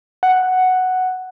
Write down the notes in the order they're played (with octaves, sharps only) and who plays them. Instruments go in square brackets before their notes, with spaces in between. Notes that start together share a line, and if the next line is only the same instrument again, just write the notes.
[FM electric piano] F#5